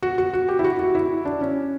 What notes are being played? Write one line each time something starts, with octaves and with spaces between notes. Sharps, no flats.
F#4
F#4
F#4
G4
E4
F#4
F#4
E4
D4
C#4